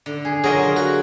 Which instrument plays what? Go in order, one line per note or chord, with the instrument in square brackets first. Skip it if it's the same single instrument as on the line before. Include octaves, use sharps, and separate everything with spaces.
[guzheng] D3
[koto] G#4
[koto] F#3 A#4 D#5 [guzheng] F4 [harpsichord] G#4
[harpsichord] F#4